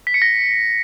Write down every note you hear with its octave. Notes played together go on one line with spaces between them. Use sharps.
B6
C#7
A#6